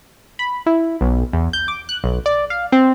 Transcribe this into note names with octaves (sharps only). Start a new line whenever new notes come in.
B5
E4
B1
E2
G6
D6
F#6
B1
D5
F5
C4